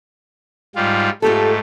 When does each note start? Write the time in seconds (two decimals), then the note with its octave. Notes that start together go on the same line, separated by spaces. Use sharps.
0.76 G#2 G3 F4
1.22 G#2 A3 F4 G4 A4